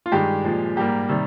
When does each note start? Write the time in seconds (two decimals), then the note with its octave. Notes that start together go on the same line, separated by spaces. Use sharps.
0.06 F4
0.12 G2 D#3 G#3 G4
0.44 A#2 F3 G#3
0.77 G#2 G3 A#3 G4
1.09 C3 D#3 G3